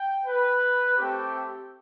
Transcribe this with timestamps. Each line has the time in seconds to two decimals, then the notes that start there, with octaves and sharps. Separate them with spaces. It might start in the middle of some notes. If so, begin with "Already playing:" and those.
Already playing: G5
0.26 B4
0.96 A3 C4 G4